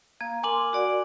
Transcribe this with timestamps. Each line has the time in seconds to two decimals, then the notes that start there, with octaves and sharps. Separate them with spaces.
0.21 A#3 F5 G#6
0.43 A#4 G#5 C6 D6 F#7
0.73 F#4 D5 F#5